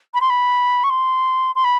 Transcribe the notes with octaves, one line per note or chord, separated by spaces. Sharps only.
B5
C6
B5
C#6
C6
C6
B5